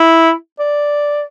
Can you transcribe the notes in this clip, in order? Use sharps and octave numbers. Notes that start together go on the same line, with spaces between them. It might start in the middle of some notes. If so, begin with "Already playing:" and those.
Already playing: E4
D5